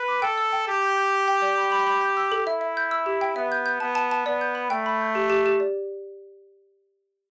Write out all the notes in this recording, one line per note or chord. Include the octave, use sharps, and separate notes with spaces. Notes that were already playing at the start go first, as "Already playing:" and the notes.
Already playing: B4
D6
A4 G5
E6
G5
G4 A5
G6
G6
G5
G5
D5
B5
B5
B5
G6
E6
A4
E4 E5
E5
G6
E6
G4
G5
B3 E5
G6
G6
B3 A5
A5
A5
B3 D5
G6
B5
A3 G5
B5
G6
G4
G4
G4
D5